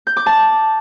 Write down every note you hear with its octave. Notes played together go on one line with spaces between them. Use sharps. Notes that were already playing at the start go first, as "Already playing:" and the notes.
G6
D6
A5